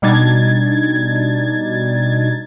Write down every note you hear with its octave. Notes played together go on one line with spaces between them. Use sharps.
B2 G3 D4 D#4 G#6 A6